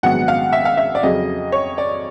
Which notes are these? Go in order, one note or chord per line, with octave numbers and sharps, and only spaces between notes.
A#1 G#2 D#3 F#3 B3 F#5
F5
E5
F5
E5
D5
F2 C#3 F#3 D#5
C#5
D5